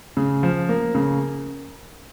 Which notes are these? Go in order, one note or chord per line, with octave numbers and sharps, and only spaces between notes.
C#3
F3
A#3
C#3